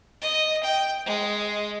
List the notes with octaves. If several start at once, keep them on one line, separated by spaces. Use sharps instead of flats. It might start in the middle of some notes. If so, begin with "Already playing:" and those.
D#5
G5
G#3